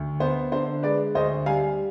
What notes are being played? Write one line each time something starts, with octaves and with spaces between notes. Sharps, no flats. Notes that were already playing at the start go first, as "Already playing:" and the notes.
Already playing: D2
B3 C5
D3 C5
G#3 B4 D5
D2 C5 D#5
G3 F5 G#5